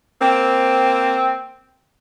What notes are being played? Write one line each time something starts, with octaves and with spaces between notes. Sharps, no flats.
A#3 C4